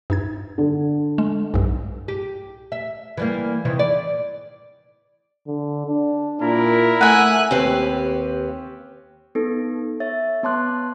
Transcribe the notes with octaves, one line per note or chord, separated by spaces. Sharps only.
G2 D#4 G#6
D3
G#3
B1 G2
G4
E5
E3 G3 A#3
C3 D#3 E3
D5
D3
D4
A#2 E4 A#4
A3 E5 F#5 G#5 F#6
D#2 C4 C#4 G4 B4 F5
B3 D#4 A4
C#5 E5 A6
B3 C#5 A5 C6 D6 F#6